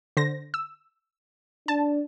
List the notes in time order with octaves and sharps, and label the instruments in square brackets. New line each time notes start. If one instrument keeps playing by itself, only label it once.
[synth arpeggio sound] D3 C5 A#6
E6
[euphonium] D4 [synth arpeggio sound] A5